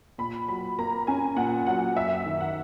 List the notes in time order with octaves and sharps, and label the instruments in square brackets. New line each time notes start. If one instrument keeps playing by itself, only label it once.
[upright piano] A#2 [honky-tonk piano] B5
[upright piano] F#3 [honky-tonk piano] B5
[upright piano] A#3 [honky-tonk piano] A#5
[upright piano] C#4 [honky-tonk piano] G#5
[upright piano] A#2 [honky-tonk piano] F#5
[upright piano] F#3 [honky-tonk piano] F#5
[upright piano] F#2 [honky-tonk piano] E5
[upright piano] D#3
[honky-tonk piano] F#5